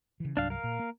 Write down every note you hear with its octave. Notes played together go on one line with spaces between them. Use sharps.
C#3 E3
C2 G2 F#3 D4 F5
A#4 F5
A#2
A#3